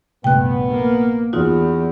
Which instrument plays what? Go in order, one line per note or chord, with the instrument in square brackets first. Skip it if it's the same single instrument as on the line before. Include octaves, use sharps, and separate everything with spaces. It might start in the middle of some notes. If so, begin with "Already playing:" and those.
[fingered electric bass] A#1 C3 A3 [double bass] G2 [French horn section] B3 [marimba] G5 F#6
[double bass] A#3
[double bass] E2 [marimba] D#4 F4 F#4